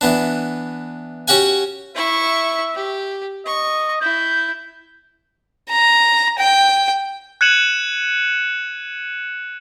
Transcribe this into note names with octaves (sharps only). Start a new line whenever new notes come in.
E3 B3 D4
C#4 F#4 G4 F#5 G#5
E4 E5 C#6
G4
D#5 C#6
E4 G6
A#5
G5
F#6 G#6 C#7 D#7 E7 F#7